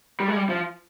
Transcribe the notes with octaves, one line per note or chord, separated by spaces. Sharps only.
G3
G#3
G3
F3